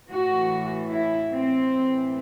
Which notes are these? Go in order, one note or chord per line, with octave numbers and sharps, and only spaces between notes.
A2 E3 F#4
E4
C4
A2 E3